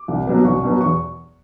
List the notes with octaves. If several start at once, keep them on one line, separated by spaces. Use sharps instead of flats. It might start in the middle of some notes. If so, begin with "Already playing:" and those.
Already playing: D6
C2
B2 F#3 B3
C2 C#6
B2 F#3 B3
E2 C#6